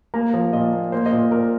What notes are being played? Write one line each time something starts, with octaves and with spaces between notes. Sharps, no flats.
A#3 A#5
F3
A#2 D#5
A#3
A#3 C5
D#5
A#2
C5
A#2 A#4